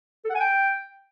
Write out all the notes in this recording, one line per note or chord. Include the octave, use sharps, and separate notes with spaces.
A4
F#5
G#5
G5